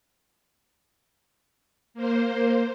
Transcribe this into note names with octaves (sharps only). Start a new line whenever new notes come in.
A#3 C5